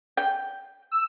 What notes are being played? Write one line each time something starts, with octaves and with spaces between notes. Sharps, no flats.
G5
E6